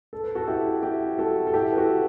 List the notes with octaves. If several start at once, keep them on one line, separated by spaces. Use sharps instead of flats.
A4
B4
F#4 A4
E4 G4
E4 G4
F#4 A4
A4
E4 G4
B4
F#4 A4